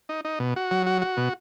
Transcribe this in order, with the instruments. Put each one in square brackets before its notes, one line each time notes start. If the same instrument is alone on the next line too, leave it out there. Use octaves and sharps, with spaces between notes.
[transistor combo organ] D#4
D#4
B2
F#4
F#3
F#4
F#4
B2